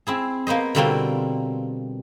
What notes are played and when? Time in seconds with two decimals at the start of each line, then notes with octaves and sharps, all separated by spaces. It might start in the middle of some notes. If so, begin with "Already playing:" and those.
0.07 C4 E4 G#4
0.47 A#3 B3 C5 D#5
0.75 B2 D3 G3 A#3 C4 F4